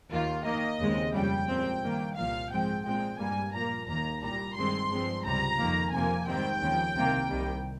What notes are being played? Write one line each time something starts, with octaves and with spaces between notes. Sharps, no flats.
D#2 D#3 A#3 F4
D#2 D#3 A#3 D#5
D#2 C#3 G#3 C4
F2 C#3 G3 G5
A#2 G#3 C4
G2 D#3 A#3
C2 A#2 F3 F5
G#2 F3 G#3 C4 G5
A#2 G#3 C4 G5
G2 G3 A#3 G#5
A#2 F3 A#3 A#5
D#2 D#3 A#3 A#5
C2 A#2 G3 A#5
G2 D#3 G#3 C4 C6
G2 F3 G#3 C4
C#2 C3 G3 A#5
F2 D#3 A#3
F2 C3 F3 A#3 G#5
G#2 D#3 G3 C4 G5
D#2 C#3 F3
C2 C3 D#3 A#3
C2 C3 D#3 G3